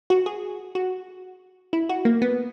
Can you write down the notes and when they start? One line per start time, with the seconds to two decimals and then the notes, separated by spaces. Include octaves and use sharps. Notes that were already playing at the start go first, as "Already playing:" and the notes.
0.10 F#4
0.26 G#4
0.75 F#4
1.73 E4
1.89 F#4
2.05 A#3
2.22 B3